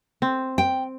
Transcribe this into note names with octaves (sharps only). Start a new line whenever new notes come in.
C4
G5